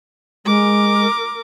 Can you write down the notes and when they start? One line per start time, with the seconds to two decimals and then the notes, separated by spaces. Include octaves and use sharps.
0.46 G#3 A#4 D6